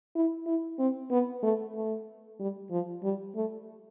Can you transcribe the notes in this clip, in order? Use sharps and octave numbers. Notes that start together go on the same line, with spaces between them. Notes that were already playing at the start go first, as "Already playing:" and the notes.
E4
E4
C4
B3
A3
A3
G3
F3
G3
A3